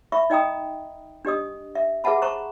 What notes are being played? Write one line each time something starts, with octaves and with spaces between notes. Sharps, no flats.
E5 B5 C#6
D#4 D#5 G5 A#5 D#6
D4 G4 D#5 D#6
E5
G#4 B4 E5 F#5 A5 B5
C5 A5 A#5 C#6